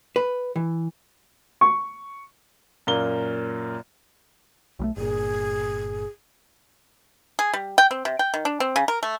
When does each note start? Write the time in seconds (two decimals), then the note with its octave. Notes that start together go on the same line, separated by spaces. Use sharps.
0.16 B4
0.56 E3
1.61 C#6
2.87 F#2 A#2 A#3 G7
4.79 B1 G3 A3
4.97 G1 A#2 G#4
7.39 G#4
7.53 G3
7.78 G5
7.91 C4
8.05 C3
8.19 G5
8.34 D#3
8.45 D4
8.60 C4
8.76 C#3
8.88 A#4
9.03 A3